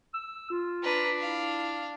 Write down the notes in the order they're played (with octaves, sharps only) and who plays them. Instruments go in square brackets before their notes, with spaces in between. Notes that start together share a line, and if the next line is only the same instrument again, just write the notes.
[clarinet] E6
F4
[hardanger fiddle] D4 [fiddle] B4 A#5
[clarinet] E4 [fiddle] F5